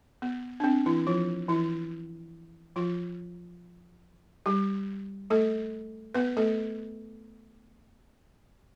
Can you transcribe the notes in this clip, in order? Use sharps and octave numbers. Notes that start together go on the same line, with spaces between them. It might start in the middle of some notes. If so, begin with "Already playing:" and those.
B3
D4
C4
E3 E4
F3 F4
E3 E4
F3 F4
G3 G4
A3 A4
B3 B4
A3 A4